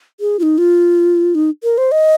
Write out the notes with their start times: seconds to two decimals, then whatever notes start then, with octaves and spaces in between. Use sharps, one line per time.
0.20 G#4
0.39 F4
0.43 D#4
0.58 F4
1.35 D#4
1.63 A#4
1.78 C5
1.92 D#5